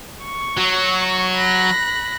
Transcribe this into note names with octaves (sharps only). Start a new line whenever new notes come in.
C#6
F#3
B5 F#6 A#6